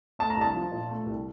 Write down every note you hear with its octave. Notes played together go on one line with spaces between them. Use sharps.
A3 A5
A#5
C2 A5
F3
A#2
A3
C2